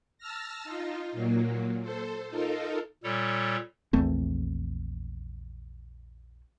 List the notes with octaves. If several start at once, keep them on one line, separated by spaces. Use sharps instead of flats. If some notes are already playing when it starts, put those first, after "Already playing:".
A5 E6 F6 A#6
D#4 F4
A#2 F#3 A#3
A4 C5
D#4 F4 A4 A#4
A#2 G3 A4 C#5
A#1 E2 A3 C4